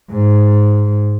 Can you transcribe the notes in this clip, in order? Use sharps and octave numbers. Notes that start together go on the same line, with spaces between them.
G#2